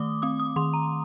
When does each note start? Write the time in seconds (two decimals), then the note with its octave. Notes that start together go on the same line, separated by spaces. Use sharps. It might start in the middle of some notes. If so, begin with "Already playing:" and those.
Already playing: D#3 A3 D6 D#6
0.22 C4 D#6
0.40 D#6
0.56 D#3 C6
0.73 A#5